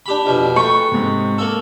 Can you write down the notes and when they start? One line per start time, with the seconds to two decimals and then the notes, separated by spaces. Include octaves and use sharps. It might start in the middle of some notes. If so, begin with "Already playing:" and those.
0.06 D4 G4 B5
0.26 F2 B2 G4
0.56 A3 B4 G5 C#6
0.92 G#2 C3
1.38 A#3 A4